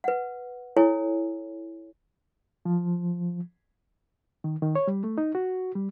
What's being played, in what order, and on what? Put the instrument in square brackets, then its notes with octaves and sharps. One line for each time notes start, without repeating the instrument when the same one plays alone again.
[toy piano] B4 F#5
E4 A4 C#5 G#5
[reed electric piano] F3
D#3
D#3
C#5
G3
A3
D#4
F#4
G3